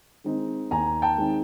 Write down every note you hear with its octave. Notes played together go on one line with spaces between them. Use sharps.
D#3 G#3 C4 D#4
D#2 G#5 A#5
G5 A5
D#3 G#3 C4 D#4